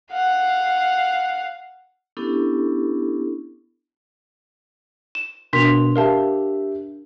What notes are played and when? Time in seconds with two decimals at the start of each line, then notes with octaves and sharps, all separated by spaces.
0.12 F5 F#5
2.17 B3 C#4 D4 E4 G4 A4
5.15 E7
5.53 B2 D4 A#4 C6 B6 F7
5.96 G4 A#4 E5 F5 A5